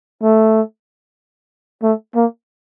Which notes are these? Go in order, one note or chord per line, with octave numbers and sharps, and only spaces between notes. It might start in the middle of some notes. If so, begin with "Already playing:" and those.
A3
A3
A#3